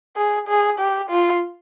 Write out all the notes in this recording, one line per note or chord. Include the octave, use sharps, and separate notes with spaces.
G#4
G#4
G4
F4